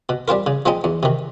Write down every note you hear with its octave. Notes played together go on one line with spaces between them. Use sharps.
B2
G3 C4 F4 A#4
C#3
F3 G#3 C4 D#4
E2
C3 D#3